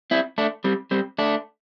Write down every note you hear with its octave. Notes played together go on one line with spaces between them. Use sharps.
C4 E4
A3 D4
G3 C4
G3 C4
A3 D4